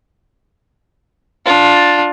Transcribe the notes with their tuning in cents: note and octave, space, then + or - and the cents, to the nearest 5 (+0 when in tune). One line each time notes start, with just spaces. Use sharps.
D4 +0 F4 +15